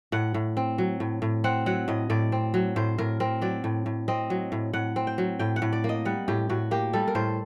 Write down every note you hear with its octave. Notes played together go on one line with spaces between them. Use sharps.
A2 F#5
A2
C4
F#3
A2
A2
C4 F#5
F#3 F#5
A2 D#5
A2 D5
C4
F#3
A2 C5
A2 A#4
C4 A#4
F#3 D5
A2
A2
C4 D#5
F#3
A2
A2 F#5
C4
G5
F#3
A2 G5
F#5
A2
D5
A#3
D#5
G3 F#5
A2 G4
A2 F#4
A#3 G4
G3 A4
A#4
A2 C5